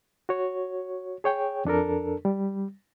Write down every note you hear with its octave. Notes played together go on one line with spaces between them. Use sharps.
F#4 C#5
G#4 C#5 G5
F2 D4 A4 A#4
G3